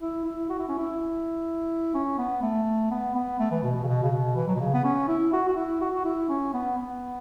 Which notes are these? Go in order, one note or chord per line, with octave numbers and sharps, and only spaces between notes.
E4
E4
F#4
E4
C#4
E4
C#4
B3
A3
B3
B3
A3
E3
B2
B2
C#3
B2
C#3
B2
E3
F#3
B2
C#3
B3
C#4
E4
F#4
F#4
E4
F#4
F#4
E4
C#4
B3
B3